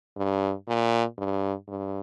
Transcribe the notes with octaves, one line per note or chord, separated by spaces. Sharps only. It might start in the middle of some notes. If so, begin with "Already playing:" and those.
G2
A#2
G2
G2